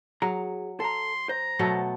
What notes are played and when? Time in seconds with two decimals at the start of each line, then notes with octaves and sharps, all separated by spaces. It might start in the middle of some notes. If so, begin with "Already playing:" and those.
0.22 F#3 G#4 A#5
0.80 A4 A#5 C6
1.29 C5 A#5
1.59 B2 F#3 A3